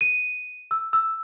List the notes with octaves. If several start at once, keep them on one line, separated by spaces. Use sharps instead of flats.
D#7
E6
E6